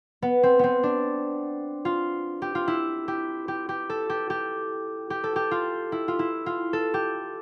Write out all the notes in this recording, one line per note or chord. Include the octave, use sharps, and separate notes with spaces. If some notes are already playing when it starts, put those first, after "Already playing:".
B3
C4
B3 C4
D4
F4
G4
F4
E4
G4
G4
G4
A4
G4
G4
G4
A4
G4
F4
E4
F4
E4
F4
A4
G4